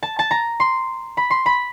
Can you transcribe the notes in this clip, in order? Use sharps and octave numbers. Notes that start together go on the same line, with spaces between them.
A5
A5
A#5
C6
B5
C6
B5